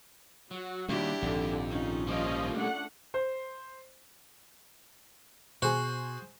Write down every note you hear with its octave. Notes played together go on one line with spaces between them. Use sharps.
F#3 F#4
D#2 G3 D4 E4 G4
A#1 F2 G#2 D3 D#3
C#4 D#4 F4
F3 G3 A#3 D#5 F5
A3 D4 F#5
C5
B2 F#4 G#4 C5